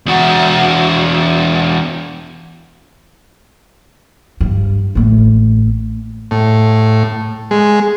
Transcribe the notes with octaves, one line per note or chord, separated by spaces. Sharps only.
E2 F#4
G2
A1 A3
A2
G#3